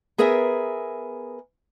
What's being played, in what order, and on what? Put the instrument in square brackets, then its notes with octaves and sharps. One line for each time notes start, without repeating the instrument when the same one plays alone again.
[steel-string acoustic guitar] B3 G#4 A#4 E5 G#5